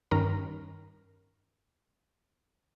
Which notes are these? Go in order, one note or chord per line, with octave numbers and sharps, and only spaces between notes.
G2 D#3 C#4 A#4 A#5